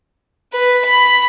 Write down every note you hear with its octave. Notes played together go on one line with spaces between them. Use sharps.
B4
B5